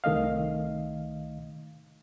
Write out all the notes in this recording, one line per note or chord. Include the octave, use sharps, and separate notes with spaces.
C2 D#3 A3 D#5 F5